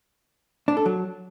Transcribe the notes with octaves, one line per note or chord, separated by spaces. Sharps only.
D4
A4
F#3